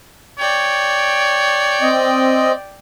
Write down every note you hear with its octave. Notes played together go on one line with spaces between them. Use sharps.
C#5 D5 G5
C4 D#5